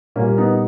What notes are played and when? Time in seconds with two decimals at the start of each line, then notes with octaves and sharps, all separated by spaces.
0.16 A#2 G3 A#3 C#4
0.38 B3 D#4